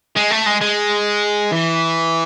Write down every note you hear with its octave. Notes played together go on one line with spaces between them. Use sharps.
G#3
A3
G#3
G#3
E3